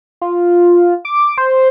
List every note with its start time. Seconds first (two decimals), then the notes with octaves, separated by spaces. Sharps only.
0.21 F4
1.05 D6
1.38 C5